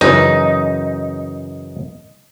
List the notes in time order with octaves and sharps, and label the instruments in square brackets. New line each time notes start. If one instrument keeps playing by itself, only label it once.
[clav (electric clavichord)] F#2 C#3 E3 [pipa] D#4